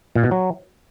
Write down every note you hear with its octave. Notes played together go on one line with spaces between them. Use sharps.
A#2
B2
F#3